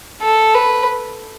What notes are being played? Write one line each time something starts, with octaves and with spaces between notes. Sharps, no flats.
A4
B4